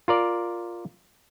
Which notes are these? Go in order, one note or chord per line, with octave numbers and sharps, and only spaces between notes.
F4 A#4 D5